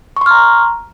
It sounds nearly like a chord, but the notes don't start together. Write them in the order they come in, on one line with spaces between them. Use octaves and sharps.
C#6 C6 F6 A#5